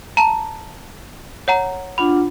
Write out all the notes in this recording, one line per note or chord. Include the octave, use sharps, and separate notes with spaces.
A5 A#5
C#5 F#5 A#5
D4 F4 F#5 B5